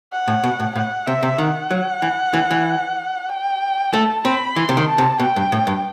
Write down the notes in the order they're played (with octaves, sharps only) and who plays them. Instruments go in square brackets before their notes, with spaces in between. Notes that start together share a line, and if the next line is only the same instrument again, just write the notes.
[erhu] F#5
[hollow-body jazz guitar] A2
B2
A2
[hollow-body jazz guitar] A2 [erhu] F#5
[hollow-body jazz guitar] C3 [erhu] E5
[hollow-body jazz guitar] C3
[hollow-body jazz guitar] D#3 [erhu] F#5
[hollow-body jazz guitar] F#3
E3
E3
E3
[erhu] G5
[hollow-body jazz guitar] A3 [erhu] A5
[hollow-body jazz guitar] C4 [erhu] B5
[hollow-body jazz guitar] E3 [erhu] C6
[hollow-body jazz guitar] C3
D#3
[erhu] A5
[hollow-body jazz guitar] C3
[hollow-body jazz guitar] B2 [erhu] G5
[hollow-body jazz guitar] G2
A2
G2